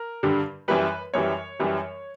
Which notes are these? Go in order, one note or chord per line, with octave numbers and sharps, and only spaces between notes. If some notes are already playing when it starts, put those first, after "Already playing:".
Already playing: A#4
G2 D3 G3
F#2 E3 G3 B4
F#2 E3 G3 C#5
F#2 E3 G3